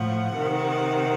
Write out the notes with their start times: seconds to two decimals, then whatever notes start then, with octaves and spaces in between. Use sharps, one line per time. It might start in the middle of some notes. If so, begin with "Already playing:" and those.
Already playing: A2 F3 F#5
0.32 C3 D#3